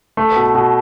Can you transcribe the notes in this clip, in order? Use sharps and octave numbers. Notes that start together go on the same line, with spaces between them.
A3
B2
B2